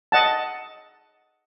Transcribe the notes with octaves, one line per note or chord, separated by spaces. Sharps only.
D#5 F#5 A5